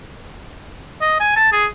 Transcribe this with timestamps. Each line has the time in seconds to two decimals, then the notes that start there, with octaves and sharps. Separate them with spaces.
1.01 D#5
1.20 G#5
1.36 A5
1.52 G#4